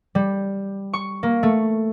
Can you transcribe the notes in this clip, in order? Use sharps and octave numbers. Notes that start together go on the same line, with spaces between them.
G3
C#6
A#3
A3